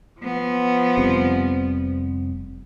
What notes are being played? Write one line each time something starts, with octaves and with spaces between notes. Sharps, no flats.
F3 B3
F1 G3 C4